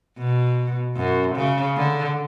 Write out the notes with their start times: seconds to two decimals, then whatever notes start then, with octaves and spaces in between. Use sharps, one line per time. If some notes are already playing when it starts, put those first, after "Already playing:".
0.18 B2
0.97 F#2
1.36 C#3
1.77 D3